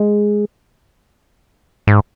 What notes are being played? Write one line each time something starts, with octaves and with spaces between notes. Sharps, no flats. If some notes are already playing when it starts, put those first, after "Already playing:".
Already playing: G#3
G#2